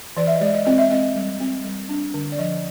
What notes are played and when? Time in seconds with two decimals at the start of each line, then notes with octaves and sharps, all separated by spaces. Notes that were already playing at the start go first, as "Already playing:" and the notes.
0.17 E3 D5
0.27 E5
0.35 D#5
0.41 G#3 D5
0.54 D#5
0.65 C4 D#5
0.78 E5
0.91 C4 D#5
1.16 G3
1.40 C4
1.64 G3
1.89 D4
2.14 D3
2.32 D5
2.38 F3 D#5